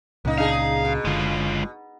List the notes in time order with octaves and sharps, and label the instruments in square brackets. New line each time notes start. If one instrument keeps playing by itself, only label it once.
[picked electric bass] C#2 A#2 C#3 [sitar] A#3 D#4
[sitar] D4 D#4 G#4 [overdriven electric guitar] F5
[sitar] B2
[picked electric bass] F#1 D3 [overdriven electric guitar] G#3 F4